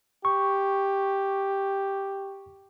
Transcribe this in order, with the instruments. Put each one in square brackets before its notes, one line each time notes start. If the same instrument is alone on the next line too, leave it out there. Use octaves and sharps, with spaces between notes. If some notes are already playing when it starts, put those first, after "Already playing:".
[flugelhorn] G4 [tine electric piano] C#6